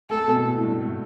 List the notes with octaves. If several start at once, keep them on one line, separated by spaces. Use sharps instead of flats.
A3 A4
B2
A2
G2
A3